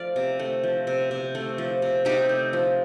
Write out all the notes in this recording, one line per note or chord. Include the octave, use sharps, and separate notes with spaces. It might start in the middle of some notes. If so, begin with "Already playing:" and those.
Already playing: F3 A3 D5 F5
C3
A3
F3
C3
C3
A3
F3
C3
C3 D#4 G4
A3
F3